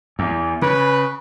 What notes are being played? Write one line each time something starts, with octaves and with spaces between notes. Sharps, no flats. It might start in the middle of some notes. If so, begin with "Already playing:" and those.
E2
C#3 B4